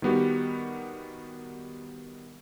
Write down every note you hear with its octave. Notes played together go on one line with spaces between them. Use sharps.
D#3 G3 B3 F#4 G4